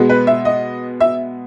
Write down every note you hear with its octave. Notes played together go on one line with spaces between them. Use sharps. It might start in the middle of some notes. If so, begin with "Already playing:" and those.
Already playing: B2 G#3 B3
B4
E5
D#5
E5